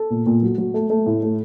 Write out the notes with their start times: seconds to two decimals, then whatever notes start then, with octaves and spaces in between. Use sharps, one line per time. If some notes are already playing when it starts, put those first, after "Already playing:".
Already playing: A4
0.10 A#2
0.26 A#2
0.43 F#3
0.58 F#3
0.74 A3
0.90 A3
1.06 A2
1.23 A3